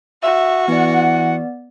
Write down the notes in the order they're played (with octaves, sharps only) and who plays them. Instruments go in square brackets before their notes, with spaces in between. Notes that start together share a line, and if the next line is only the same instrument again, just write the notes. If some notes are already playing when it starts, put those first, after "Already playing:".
[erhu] F#4 [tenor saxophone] E5
[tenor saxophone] E3 [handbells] B3 D5 [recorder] F#5